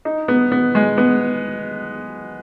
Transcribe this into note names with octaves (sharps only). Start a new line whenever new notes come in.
D#4
B3
B3
G#3
B3